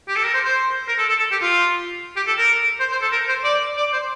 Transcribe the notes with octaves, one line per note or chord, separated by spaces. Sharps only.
G4
A4
A#4
C5
C5
A#4
A4
A4
A4
G4
F4
G4
A4
A#4
C5
C5
A4
A#4
C5
D5
D5
C5